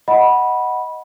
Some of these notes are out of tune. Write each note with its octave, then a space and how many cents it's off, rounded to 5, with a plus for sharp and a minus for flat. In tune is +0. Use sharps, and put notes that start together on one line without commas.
D#5 +5 F#5 +5 B5 -15